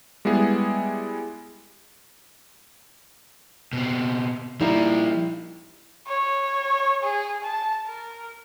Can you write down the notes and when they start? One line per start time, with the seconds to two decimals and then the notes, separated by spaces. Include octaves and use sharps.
0.25 G3 G#3 B3 E4 G#4
3.73 B2 C4
4.61 F3 G3 A#3 D#4 E4
6.08 C#5
7.03 G#4
7.44 A5
7.86 A#4